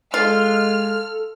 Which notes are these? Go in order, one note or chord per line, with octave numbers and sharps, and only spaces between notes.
G#3 F4 A4 F6